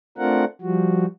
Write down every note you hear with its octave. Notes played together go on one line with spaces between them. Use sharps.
A3 C4 D4 F4 A#4 F#5
F3 G3 F#4